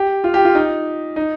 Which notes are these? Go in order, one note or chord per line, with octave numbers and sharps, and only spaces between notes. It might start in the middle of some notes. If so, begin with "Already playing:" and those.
Already playing: G4
F4
G4
F4
D#4
D#4